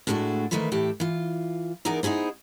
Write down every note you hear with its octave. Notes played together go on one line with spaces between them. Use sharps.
A2 G#3 A3 C#4 D4 F#4
D#3 E3 A3 A#3 B4 C5
A2 E3 G4 E5
E3 F4
E3 B3 D#4 G#4 A#4 D5
B3 D#4 E4 G#4 C5